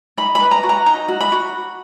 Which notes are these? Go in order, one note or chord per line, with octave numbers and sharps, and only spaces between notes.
D#4 B5
B5
B4
A#5
F#4
A#5
D#4 A#5
F#4
B5
F#4